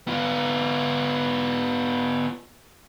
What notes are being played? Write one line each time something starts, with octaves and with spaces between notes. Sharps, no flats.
B3 F4